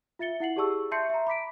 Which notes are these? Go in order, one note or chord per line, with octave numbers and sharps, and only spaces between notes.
F4 E5 A6 C#7 G7
E4 F#5 C7 F#7
G4 G#4 D5 A5 C#6 E6
E5 A5 C6 G6 C7 C#7
E5 A#5
B5 D6 B6 D7